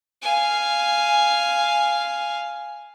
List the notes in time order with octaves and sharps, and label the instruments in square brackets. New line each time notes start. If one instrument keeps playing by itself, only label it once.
[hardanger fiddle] F5 G#5